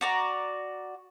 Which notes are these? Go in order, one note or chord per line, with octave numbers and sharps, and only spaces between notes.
F#4 D5 A#5